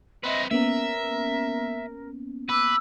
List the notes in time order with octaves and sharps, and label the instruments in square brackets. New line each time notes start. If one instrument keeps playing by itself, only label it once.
[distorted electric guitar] C4 B4 [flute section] D#5 E5 B5
[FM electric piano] A#3 B3 C#4 [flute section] A#4 [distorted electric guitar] E5
[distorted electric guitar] B4 [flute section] D6 E6